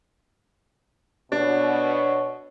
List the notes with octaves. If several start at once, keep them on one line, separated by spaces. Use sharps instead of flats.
B2 D4 C#5